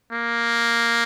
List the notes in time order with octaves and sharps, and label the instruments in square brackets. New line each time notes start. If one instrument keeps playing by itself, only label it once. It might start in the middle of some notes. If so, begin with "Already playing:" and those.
[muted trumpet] A#3